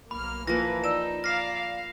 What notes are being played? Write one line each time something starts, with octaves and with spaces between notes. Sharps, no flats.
B1 A#3 B5 F6
E3 F3 A#3 B4 A#6
D#4 D5 E6 E7
D5 F5 A#5 F6 A#6 C7 E7
F5